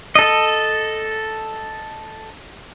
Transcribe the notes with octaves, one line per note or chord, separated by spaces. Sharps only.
A4 D#5